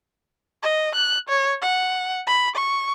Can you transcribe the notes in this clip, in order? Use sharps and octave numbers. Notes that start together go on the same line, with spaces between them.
D#5
F#6
C#5
F#5
B5
C#6